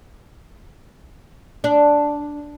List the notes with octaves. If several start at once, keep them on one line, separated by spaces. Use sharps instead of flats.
D4